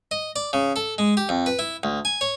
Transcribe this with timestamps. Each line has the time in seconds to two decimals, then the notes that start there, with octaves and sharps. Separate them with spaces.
0.11 D#5
0.36 D5
0.53 C#3
0.76 A4
0.98 G#3
1.17 G4
1.29 F2
1.46 B4
1.59 E4
1.83 D2
2.05 G#5
2.21 C#5